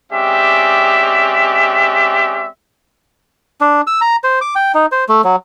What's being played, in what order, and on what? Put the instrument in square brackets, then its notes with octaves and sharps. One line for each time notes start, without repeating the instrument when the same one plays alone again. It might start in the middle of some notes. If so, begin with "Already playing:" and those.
[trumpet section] G#3 C4 C#4 G4 D5 E5
[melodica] D4
E6
A#5
C5
D6
G5
D#4
C5
A3
F#3